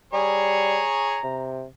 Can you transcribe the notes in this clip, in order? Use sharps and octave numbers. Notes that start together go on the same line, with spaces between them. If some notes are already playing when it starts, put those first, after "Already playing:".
G3 G#4 C#5 A#5
C3